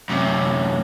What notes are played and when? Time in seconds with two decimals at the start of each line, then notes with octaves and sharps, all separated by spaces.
0.10 F#2 C3